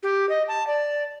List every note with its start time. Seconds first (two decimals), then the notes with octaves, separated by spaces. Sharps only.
0.03 G4
0.29 D#5
0.48 A5
0.67 D5